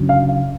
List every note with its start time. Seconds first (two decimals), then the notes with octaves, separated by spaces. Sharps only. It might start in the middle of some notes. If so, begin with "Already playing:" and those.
Already playing: F#1 F#2 D3 F#3
0.09 F5
0.29 F5